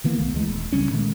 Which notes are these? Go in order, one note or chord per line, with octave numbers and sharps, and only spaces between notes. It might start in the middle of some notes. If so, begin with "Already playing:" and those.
D3 E3 A#3 B3
C2 D#3 A3 B3
D2 E3 G#3
D#1
C#2 C#3 G3 C#4
A#2 D#3 G#3 A3